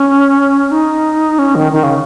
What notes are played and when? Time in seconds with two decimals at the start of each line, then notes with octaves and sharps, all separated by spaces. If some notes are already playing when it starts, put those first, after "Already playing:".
Already playing: C#4
0.71 D#4
1.39 C#4
1.55 D#3
1.72 D#3
1.83 C#3